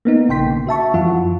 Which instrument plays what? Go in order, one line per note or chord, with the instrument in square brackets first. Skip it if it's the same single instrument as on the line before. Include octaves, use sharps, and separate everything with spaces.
[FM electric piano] A#3 B3 D#4
A#1 C#3 G5 C6 B6
D3
F#4 E5 A5 C#6
F#2 E3 F3 F4 F#5